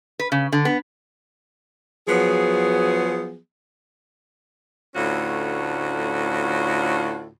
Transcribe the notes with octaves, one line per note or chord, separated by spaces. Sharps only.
B4
C#3
D3
B3
F3 F#3 B3 G#4
D2 A2 C#4 F4 F#4